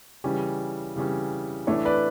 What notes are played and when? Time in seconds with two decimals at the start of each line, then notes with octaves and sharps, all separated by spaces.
0.24 C#3 E3 G3 C#4
0.96 C#3 E3 G3 C#4
1.67 A2 E3 A3 D4 C#5
1.85 B4 D5